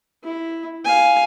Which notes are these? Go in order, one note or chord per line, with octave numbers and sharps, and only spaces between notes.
E4
F5 G#5